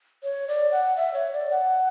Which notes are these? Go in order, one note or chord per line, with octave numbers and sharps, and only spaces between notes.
C#5
D5
F#5
E5
C#5
D5
F#5